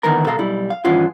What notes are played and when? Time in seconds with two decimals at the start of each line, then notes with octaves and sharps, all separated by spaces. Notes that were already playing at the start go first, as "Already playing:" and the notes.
0.03 D2 D#3 E3 B3 A#4 A#5
0.26 B2 A4 F5 A#5
0.39 B1 G3 E4
0.70 F5
0.84 G2 D#3 E3 C#4 F4 F#4